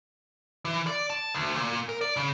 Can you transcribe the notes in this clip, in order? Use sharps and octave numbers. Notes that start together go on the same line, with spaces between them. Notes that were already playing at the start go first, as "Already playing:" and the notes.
E3
D5
A5
D2
A#2
A#4
D5
C#3